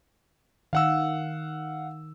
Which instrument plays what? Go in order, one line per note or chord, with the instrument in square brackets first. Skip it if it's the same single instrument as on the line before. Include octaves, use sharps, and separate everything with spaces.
[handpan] D#3 [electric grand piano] F5 F#5 E6